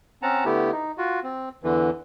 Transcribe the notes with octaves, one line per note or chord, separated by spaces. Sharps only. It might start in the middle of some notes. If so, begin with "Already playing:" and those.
C4 C#4 F#5 A5 A#5
D3 A3 B3 E4 G4
D#4
F4 F#4
C4
E2 D3 E3